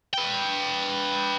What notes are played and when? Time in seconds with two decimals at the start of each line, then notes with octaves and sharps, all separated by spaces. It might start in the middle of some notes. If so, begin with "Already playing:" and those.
0.13 B4 G5